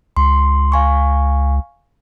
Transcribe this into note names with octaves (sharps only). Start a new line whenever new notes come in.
C#2 C6
F5 G#5 C#6